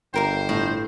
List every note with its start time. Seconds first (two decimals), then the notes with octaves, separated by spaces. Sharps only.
0.14 G1 G4 A#4 C5 F5
0.49 A2